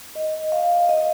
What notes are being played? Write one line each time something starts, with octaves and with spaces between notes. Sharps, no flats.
D#5
F5
D#5